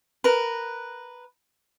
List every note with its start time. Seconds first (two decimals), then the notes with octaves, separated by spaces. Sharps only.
0.24 A#4 B4